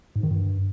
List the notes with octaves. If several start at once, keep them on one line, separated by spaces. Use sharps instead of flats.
G#2
D#3
G2